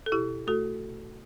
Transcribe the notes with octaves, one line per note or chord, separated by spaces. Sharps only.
A4
B2 E4 G4
A3 F#4 A4